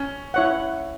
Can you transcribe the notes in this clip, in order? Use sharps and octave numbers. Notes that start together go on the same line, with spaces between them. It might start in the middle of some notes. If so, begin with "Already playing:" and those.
Already playing: C#4
E4 C#5 F#5